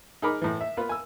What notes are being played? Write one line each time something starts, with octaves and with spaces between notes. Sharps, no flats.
D#4 G#4 A#4 B5 D6
A2 E3
E5
A#3 B3 F4 B4
G#5 E6